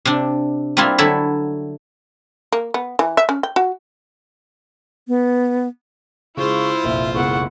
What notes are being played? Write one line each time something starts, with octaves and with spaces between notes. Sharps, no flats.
C3 D4
G3 A#3 C4 E4 F4
D3 F#3 E4 A4 B5
A#3
B3
E3
E5
C#4
G5
F#4
B3
C#3 G#3 E4 F4 C5 C#6
F1 A#1 E5
F#1 B1 G#3 E4 F#5 C#6